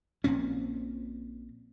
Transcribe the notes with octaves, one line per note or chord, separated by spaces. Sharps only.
A#1 A#2 C4 C#4